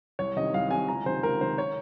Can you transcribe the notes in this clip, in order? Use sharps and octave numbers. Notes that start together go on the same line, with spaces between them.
C2 C#5
C3 D#3 D#5
C2 F5
C3 D#3 G#5
C#2 A#5
C3 D#3 C5
C#2 A#4
C3 D#3 C5
C#5